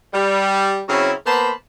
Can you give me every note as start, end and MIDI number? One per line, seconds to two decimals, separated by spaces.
0.13 0.81 55
0.89 1.12 49
0.89 1.12 54
0.89 1.12 60
0.89 1.12 61
0.89 1.12 64
1.26 1.51 58
1.26 1.51 59
1.26 1.51 72
1.26 1.51 81
1.26 1.51 83